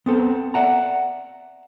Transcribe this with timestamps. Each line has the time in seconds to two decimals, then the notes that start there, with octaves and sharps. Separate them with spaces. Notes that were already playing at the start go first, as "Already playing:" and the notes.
0.06 B3 C4 A4
0.54 D5 E5 F#5 A#5